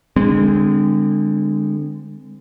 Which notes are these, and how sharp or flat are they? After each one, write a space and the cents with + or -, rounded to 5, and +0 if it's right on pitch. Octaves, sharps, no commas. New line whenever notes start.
D3 +15 G#3 -25 C4 -25